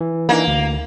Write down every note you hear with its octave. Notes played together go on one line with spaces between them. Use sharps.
E3
E3 A#3 D4 D#4
D2